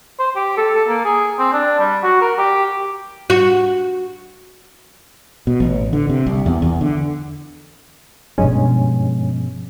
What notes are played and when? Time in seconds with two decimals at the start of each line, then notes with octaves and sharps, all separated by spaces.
0.20 C5
0.36 G4
0.57 A4
0.75 A4
0.88 A#3
1.05 G#4
1.39 C4
1.53 D4
1.80 G3
2.03 F#4
2.21 A#4
2.38 G4
3.30 F#4
5.47 B2
5.60 A1
5.93 D3
6.10 C3
6.26 C2
6.46 E2
6.62 E2
6.81 D3
8.38 G2 B2 F3 G#3 C#4